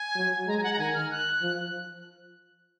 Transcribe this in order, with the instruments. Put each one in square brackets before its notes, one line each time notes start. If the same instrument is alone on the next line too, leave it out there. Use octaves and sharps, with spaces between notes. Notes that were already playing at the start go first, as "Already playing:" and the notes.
Already playing: [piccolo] G#5
[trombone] F#3
[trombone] G#3 [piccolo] A#5
[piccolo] G#5
F#5
A#5
[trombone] D#3 [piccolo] G#5
[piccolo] F6
F#6
[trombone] F3